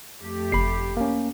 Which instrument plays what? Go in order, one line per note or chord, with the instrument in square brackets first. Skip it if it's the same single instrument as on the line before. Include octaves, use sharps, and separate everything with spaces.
[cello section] F2 A3 G4
[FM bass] F#1 [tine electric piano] B5 C7
[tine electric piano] A#3 C#4